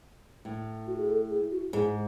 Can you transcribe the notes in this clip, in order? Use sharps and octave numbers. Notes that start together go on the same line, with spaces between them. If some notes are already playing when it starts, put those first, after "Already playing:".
A2
F#4
G#4
A4
G#4
F#4
G#2 G#4